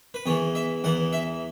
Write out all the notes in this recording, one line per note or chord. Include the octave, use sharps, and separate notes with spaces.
B4
E2 E3 C#5
E5
E2 E3 F#5
E5